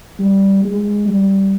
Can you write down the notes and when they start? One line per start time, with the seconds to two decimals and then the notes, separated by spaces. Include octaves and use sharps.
0.19 G3
0.64 G#3
1.08 G3